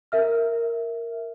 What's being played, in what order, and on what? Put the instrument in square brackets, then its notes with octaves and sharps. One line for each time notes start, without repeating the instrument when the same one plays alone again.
[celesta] A#4 E5 F6